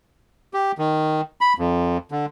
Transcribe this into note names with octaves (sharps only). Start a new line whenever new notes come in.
G4
D#3
B5
F2
D3